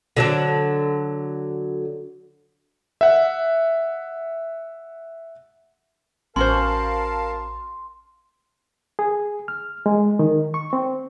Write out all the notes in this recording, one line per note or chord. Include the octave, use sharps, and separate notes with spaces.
D3 F#3 D4
E5 F#5
A1 C#4 F#4 A#4 C5 F5 A5 C6
G#4
F6
G#3
D#3
C#6
C4